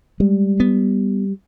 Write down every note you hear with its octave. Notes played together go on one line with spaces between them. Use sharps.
G3 G#3
B3